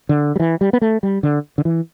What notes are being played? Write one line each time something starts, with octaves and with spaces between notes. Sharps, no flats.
D3
G3
E3
G3
B3
A3
G3
D3
D3
E3